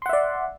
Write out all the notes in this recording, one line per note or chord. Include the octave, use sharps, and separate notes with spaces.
D5 E5 F#5 C6